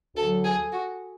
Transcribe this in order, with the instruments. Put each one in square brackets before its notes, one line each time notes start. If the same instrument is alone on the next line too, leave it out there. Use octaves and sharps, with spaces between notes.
[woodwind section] D2 D3 F#3 [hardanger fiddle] A4
[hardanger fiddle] G#4
F#4